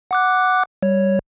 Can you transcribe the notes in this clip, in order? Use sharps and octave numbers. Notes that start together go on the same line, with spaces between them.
F#5 D6 F#6
G3 C#5